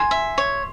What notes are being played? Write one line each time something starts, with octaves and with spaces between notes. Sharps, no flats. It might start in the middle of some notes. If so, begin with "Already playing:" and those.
Already playing: G#5 C6
E5
C#5